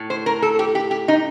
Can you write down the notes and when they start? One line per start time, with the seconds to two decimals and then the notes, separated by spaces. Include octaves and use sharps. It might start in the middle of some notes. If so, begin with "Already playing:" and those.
Already playing: A2
0.10 C5
0.26 A#4
0.42 A4
0.59 G4
0.75 G4
0.91 G4
1.08 D#4